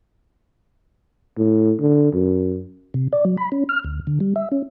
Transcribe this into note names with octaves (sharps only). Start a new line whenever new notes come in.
A2
D3
F#2
C3
D5
F#3
B5
C#4
F6
D2
D3
G3
E5
C#4